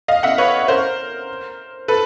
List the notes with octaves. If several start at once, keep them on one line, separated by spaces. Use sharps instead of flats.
D#5 F5
E5 F#5
B4 C#5
A#4 C5
A4 B4